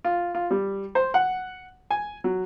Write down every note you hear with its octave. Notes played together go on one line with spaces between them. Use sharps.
F4
F4
G3
C5
F#5
G#5
F#3